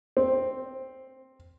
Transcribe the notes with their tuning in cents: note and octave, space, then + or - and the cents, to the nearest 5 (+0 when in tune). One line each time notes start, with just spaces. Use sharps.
C4 +5